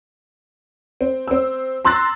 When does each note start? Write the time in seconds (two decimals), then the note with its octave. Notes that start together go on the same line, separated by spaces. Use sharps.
1.01 C4
1.28 C4 E6
1.85 A#5 C6 E6 F#6 A6 A#6